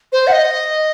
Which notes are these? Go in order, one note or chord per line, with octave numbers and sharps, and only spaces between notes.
C5
F#5
D#5